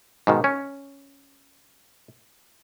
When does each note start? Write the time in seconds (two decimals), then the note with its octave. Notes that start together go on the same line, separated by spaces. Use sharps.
0.27 G#2 B2 D#3
0.44 C#4